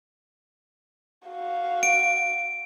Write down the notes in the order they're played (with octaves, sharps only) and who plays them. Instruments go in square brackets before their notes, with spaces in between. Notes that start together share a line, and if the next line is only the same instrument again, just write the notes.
[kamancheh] F#4 F5
[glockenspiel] D7